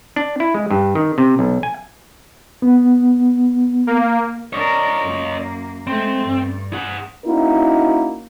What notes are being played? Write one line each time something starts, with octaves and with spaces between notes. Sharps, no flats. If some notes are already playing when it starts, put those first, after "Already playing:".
D4
E4
G#3
G2
D#3
C3
B1
G#5
B3
A#3
D4 A#4 C#5 D#5
F#2 A#3
G#3 A3 C4
G2
G#4 F#5
A#3 C#4 D#4 E4 F#4 A#4